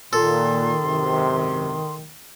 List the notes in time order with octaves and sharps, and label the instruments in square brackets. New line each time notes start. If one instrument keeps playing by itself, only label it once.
[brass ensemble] A#2 [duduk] D#3 [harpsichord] A4 [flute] C6
[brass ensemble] G#1 F#2 C3